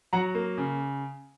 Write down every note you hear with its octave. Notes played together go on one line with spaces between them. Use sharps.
F#3 F#5 A#5
A#3
C#3